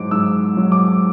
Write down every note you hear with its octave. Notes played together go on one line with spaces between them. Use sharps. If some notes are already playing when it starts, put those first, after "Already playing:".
Already playing: G#2 F#3 D6
G#2 E6
F#3
D6